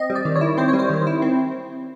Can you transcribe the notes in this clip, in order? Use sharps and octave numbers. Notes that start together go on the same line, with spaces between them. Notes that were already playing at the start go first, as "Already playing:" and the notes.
Already playing: C4 D#5
G3
D5
D#3
C#5
E4
C4 C5
C#5
G3
C5
D#3
E4
C4